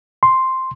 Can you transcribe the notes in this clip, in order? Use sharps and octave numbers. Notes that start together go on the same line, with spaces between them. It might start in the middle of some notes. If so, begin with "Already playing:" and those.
C6